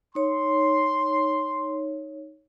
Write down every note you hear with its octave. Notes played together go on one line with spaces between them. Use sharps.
D#4 C#5 C6